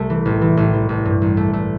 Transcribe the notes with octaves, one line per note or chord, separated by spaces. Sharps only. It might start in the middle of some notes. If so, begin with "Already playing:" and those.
Already playing: C2 C3 A3
E3
A1
E3
A1
E3
A1
G2
A1
A3
A3